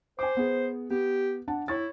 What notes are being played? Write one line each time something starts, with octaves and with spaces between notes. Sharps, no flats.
C5 G#5 D6
B3 G#4
B3 G4
D4 F#5 A5
E4 C#5 C#6 A6